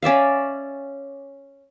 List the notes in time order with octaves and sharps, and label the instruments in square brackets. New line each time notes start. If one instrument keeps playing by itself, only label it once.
[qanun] C#4 D5 E5 F5